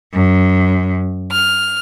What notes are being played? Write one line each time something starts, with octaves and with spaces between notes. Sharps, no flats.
F#2
F6